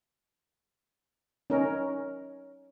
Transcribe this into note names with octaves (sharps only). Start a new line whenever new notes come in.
C#4 D#4 A#4